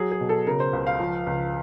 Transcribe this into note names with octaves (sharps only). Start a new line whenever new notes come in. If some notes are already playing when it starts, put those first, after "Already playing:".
Already playing: F#3 G#4
G#4
B2
A4
C#3 A#4
C5
C#2
F5
F3
C#2